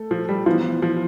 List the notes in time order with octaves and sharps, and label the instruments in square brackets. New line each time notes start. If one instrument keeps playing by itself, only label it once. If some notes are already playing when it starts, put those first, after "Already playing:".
Already playing: [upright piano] A3 A4
[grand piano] F3
G3
[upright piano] E3 B3 F4 [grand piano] F3
[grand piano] F3